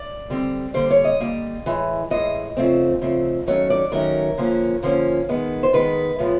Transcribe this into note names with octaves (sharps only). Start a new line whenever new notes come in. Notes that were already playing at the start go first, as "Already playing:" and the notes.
Already playing: D5
D3 G3 C4
D3 G3 A#3 C5
C#5
D#5
D3 G3 A#3
A2 E3 G#3
A2 E3 G#3 D#5
C#3 F3 A3 C4
C#3 F3 A3 C4
D#3 F#3 A3 C#4 C#5
D5
D#3 F#3 A3 C#4 A#4
D3 F3 A#3 C#4
D3 F3 A#3 C#4
D#3 G#3 B3
C5
D#3 G#3 B3 B4
A2 F3 G#3 B3